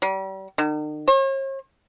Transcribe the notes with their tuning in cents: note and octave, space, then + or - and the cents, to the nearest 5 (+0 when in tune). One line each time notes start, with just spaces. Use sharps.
G3 -35
D#3 -45
C#5 -45